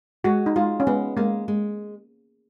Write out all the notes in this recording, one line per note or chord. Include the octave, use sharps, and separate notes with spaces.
G#3 F#4
D#4
G#3 F4
C#4
G#3 B3
G#3 A#3
G#3